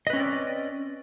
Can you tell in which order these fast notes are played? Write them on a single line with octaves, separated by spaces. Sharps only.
D#5 B4 C#4 C4 D5